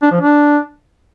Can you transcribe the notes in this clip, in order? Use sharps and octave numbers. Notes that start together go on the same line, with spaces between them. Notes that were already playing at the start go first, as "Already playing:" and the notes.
D4
F3
D4